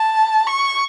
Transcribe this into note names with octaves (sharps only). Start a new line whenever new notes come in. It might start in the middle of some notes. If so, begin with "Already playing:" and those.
Already playing: A5
C#6